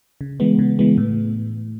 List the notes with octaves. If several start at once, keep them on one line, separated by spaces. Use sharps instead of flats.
C#3
E3 G#3 B3
C#3
E3 G#3 B3
A2